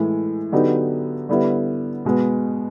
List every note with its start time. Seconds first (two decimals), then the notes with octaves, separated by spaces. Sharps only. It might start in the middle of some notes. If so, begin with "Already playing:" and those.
Already playing: A2 E3 G#3
0.52 D3 F#3 B3 D#4 G4
1.29 D3 G3 B3 E4
2.05 B2 G#3 B3